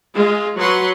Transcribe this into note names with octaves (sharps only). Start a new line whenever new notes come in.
G#3 F4
F#3 B4 F#5 C6